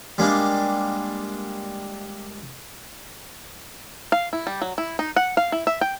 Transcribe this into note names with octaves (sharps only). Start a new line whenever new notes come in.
G3 G#3 A#3 D4
F5
E4
G3
F#3
E4
D#4
F#5
F5
E4
E5
G5